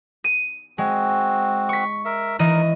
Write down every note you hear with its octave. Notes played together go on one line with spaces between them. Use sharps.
D#7
G#3 C4 F#4
C#6 B6
A#4 E5
E3 D#4 A#4 D#5